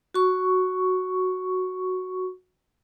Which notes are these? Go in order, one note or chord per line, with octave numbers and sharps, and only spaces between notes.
F#4 C#6